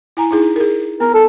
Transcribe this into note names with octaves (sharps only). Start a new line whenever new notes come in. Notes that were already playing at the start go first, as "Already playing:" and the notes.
E4 G#5 A#5
D#4 E4 G#4
G#4 A#4
B3 A#4
A4